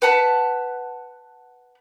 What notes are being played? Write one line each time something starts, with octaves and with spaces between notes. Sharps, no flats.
B4 F#5 A5 B5